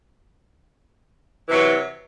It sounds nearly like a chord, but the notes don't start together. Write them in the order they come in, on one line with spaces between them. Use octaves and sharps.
E3 C3 F#3